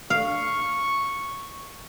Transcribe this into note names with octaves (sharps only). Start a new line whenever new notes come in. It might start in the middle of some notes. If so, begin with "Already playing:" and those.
F5 C#6